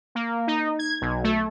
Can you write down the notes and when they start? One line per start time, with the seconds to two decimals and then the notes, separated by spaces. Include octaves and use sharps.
0.15 A#3
0.47 D#4
0.79 G#6
1.01 B1
1.24 A3